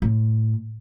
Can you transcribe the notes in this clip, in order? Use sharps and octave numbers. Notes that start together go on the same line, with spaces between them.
A2